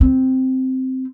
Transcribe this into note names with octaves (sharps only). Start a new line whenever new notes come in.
C4